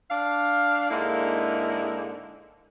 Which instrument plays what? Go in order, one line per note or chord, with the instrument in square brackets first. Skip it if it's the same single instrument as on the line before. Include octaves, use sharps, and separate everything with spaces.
[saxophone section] D4 F5
G#2 D3 G#3 A#3 E4